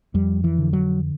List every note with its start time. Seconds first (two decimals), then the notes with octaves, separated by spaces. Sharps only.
0.14 F2 G3
0.44 E3
0.58 D3
0.73 F#3